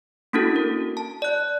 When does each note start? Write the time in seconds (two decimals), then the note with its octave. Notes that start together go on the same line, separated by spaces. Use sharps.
0.33 A#3 C#4 D4 E4 F#4 A4
0.56 A#4
0.97 A5
1.22 D5 F#6